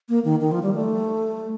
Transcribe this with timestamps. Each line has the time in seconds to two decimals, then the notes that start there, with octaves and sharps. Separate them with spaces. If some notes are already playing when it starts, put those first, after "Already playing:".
0.09 A#3
0.25 D#3
0.41 D#3
0.52 F3
0.63 G3
0.74 A3